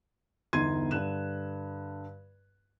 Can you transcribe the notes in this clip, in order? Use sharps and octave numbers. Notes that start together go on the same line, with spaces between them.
G1 E2 D#4 C6 G#6 D#7
G2 D3 F#6 E7